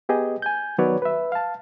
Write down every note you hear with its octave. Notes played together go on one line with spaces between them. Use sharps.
B3 G4 G#4 D#5
G#5 G6
D#3 F#3 B3 B4 C#5 D5
B4 E5
F5 A5